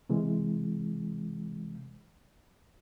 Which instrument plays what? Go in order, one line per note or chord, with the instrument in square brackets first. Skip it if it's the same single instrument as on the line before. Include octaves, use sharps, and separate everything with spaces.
[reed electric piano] C3 E3 G#3